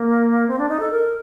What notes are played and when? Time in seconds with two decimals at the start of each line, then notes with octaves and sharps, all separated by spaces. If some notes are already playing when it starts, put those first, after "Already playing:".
Already playing: A#3
0.48 C4
0.59 D4
0.69 D#4
0.80 A4
0.91 A#4